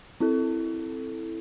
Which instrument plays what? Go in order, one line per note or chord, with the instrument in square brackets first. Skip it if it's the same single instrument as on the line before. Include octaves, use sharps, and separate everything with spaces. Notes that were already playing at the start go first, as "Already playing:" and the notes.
[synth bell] C4 E4 A4